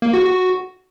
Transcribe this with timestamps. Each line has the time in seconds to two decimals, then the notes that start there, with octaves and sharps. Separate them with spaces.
0.02 A#3
0.13 F#4
0.25 F#4